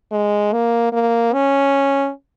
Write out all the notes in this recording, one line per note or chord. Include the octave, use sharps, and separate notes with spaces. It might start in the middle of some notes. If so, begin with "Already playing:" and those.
G#3
A#3
A#3
C#4